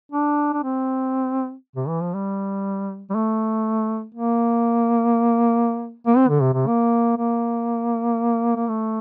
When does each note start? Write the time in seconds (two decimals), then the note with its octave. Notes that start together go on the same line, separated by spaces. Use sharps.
0.12 D4
0.53 D4
0.63 C4
1.76 C3
1.88 E3
2.01 F3
2.14 G3
3.10 G3
3.15 A3
4.15 A#3
6.07 A#3
6.17 C4
6.28 D3
6.42 C3
6.54 C3
6.67 A#3
7.17 A#3
8.56 A#3
8.68 A3